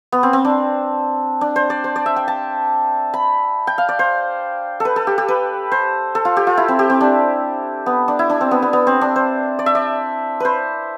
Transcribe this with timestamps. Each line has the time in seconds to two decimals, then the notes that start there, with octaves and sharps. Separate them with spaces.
0.12 B3
0.23 C4
0.33 C4
0.45 D4
1.41 D4
1.56 C5
1.70 D5
1.84 C5
1.96 D5
2.06 E5
2.16 G5
2.28 A5
3.14 B5
3.67 G5
3.78 F5
3.89 D5
3.99 C5
4.80 A4 B4
4.96 A4
5.07 G4
5.18 G4
5.28 B4
5.72 C5
6.15 A4
6.25 F4
6.37 G4
6.47 F4
6.57 E4
6.68 C4
6.79 G4
6.90 C4
7.01 D4
7.86 B3
8.08 D4
8.19 E4
8.30 D4
8.41 C4
8.51 B3
8.62 B3
8.73 B3
8.87 C4
9.01 D4
9.16 C5
9.59 D5
9.66 E5
9.75 D5
10.40 B4 C5